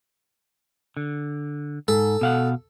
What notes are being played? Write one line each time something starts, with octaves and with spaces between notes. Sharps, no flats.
D3
G#2 A4
B2 F5 F#5